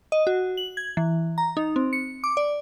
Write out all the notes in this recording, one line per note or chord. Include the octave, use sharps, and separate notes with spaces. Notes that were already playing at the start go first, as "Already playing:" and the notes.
D#5
F#4
F#7
G#6
E3
A#5
D#4
C4
C#7
D6
D5